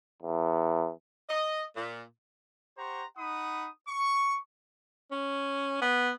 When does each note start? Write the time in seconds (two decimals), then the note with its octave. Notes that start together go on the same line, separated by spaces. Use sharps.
0.22 E2
1.29 D#5
1.76 A#2
2.78 G4 C5 F#5 A#5 C6 C#6
3.17 D#4 F#5 B5 D#6
3.88 C#6
5.11 C#4
5.82 B3